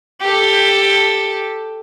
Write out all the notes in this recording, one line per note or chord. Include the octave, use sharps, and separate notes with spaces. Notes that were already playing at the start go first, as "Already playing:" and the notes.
G4 A4